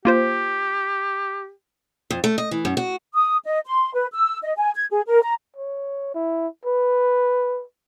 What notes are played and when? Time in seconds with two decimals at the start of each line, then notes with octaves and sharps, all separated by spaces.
0.05 A#3 F4 G4 C5
2.10 F2
2.24 A3
2.38 D#5
2.51 E3
2.65 F#2
2.77 F#4
3.14 D#6
3.45 D#5
3.65 C6
3.94 B4
4.13 E6
4.43 D#5
4.57 G#5
4.75 G#6
4.90 G#4
5.07 A#4
5.22 A#5
5.57 C#5
6.14 E4
6.65 B4